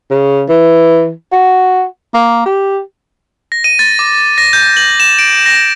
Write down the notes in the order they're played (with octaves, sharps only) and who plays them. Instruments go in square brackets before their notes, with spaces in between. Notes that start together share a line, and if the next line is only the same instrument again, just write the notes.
[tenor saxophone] C#3
E3
F#4
A#3
G4
[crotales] A#6
D#7
A6
D6
A#6
G6
F#7
E7
D7
A#6